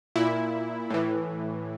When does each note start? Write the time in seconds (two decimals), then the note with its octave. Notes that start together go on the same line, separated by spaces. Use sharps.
0.16 A#2 E4
0.90 A2 E3